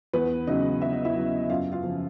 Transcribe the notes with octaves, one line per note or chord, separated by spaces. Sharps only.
E2 B3 B4
C#3 F#3 D#4 D#5
E2 E5
D#5
E4 E5
C#3 F#3
F#2 F4 F5
F4 F5
C#3 F3